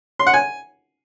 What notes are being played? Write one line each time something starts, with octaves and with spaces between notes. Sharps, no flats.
C6
F#5
G#5